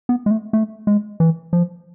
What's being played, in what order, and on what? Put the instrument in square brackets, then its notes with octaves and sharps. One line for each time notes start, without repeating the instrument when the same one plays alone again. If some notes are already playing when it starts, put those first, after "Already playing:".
[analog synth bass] B3
G#3
A3
A3
G#3
E3
F3